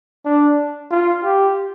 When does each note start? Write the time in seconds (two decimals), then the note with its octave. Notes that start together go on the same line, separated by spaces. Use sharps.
0.25 D4
0.91 F4
1.24 G4